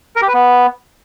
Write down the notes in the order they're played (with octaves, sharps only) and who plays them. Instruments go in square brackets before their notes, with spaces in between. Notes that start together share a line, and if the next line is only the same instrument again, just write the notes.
[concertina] A#4
G4
B4
B3